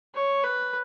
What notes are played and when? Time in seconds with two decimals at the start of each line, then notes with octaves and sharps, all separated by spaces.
0.15 C#5
0.44 B4